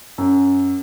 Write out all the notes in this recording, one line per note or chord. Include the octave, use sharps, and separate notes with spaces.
F#2